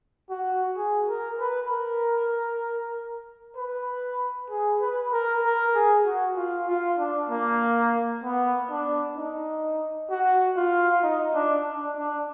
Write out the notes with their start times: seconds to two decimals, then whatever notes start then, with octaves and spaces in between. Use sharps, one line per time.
0.30 F#4
0.77 G#4
1.08 A#4
1.39 B4
1.70 A#4
3.57 B4
4.50 G#4
4.81 B4
5.12 A#4
5.44 A#4
5.75 G#4
6.06 F#4
6.36 F4
6.68 F4
6.99 D4
7.30 A#3
8.23 B3
8.70 D4
9.17 D#4
10.10 F#4
10.56 F4
11.03 D#4
11.35 D4
11.66 D4
11.97 D4